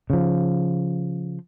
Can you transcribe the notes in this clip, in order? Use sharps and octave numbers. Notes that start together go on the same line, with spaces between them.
C#3 F3